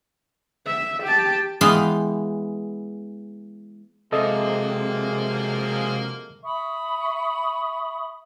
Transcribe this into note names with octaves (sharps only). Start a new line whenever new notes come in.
E5
G4 A5
E3 G#3 B3 F5 G5
C3 F3 F#3 G#3 A#3 A4 D#5 E5
E5 B5 C#6 D#6